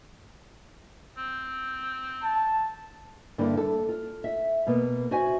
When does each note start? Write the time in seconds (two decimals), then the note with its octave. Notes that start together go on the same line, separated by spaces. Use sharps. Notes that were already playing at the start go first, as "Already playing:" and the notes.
1.18 C4
2.24 A5
3.38 G2 D3 A#3 E4
3.57 A4
3.89 F4
4.24 E5
4.67 B2 A#3 B3
5.11 F#4 C5 E5 G#5